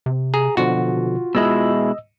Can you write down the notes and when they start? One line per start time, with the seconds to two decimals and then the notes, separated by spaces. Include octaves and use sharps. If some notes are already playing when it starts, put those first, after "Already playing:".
0.06 C3
0.34 G#4 A#5
0.57 B2 D3 F3 F4 F#4
1.35 B2 G#3 E4 D#5 E6